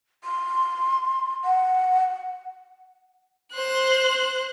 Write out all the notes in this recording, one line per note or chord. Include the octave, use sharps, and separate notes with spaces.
C6
F#5
C5 F#6